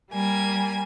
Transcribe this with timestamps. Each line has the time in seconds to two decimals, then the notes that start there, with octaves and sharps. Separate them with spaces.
0.10 G3 A#3 G#5